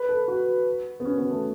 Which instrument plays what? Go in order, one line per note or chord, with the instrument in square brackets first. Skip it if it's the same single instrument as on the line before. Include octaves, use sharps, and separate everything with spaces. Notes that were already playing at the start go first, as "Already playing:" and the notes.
Already playing: [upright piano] B4
A4
F#4
B3
C#4
B3
A3